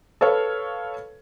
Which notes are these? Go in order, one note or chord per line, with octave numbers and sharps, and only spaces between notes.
A4 B4 C#5 F5